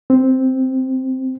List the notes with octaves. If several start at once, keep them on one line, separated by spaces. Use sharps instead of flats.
C4